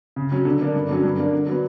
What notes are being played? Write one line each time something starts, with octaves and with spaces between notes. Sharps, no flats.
C#3
F#3 C#4
D3
A#3 D4
G2
D3 F#3 C#4
G2
D3 A#3 D4
D3
F#3 B3